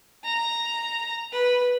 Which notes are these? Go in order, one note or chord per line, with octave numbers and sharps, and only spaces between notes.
A#5
B4